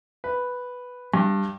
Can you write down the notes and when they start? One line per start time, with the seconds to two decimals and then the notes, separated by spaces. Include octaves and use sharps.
0.24 B4
1.14 G2